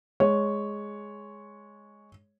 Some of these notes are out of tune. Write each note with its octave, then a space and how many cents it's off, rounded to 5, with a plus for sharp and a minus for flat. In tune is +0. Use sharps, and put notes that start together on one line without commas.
G#3 +0 C#5 +0